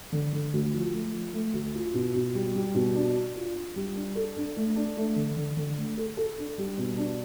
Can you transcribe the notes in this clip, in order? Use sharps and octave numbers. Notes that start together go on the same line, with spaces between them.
D3
D3
D2
F3
A3
F3
A3
D2
F4
B2
B2
G3
G3
B2
D4
D4
F4
D4
G3
D4
A4
D4
A3
D4
A3
D3
D3
D3
A3
A4
A4
D4
G3
B2
D4